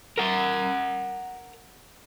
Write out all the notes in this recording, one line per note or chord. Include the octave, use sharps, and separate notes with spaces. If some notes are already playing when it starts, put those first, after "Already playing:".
A#4 F#5